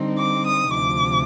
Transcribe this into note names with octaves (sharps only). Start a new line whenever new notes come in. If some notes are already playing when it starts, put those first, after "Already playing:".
Already playing: D3 G3 C4 D#4
D6
D#6
D2 C3 F3 D6